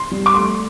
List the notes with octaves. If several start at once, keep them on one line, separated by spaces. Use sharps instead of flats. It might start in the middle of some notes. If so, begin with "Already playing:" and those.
Already playing: C6
G3
D6
A3 C6